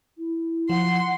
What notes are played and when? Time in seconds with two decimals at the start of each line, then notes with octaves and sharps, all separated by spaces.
0.18 E4
0.69 F3 F#5 C6